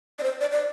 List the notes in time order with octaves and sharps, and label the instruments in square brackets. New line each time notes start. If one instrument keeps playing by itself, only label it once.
[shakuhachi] D5
C5
D5
D5